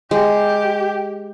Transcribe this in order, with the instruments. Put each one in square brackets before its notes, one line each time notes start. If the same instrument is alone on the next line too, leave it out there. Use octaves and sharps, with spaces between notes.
[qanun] G#3 [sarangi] G4